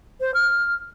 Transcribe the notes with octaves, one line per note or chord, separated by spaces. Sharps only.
C5
F6